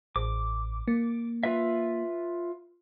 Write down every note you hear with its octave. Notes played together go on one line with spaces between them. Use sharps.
A1 D6
A#3
F4 B4 E5